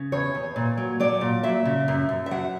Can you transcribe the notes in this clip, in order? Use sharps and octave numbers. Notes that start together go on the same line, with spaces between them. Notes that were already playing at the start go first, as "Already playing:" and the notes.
Already playing: C#3
E2 C#5
E2
A#2
F#3
F#3 D5
A#2
F#3 E5
C#3
F#2
F#2
E5
F#3 F#5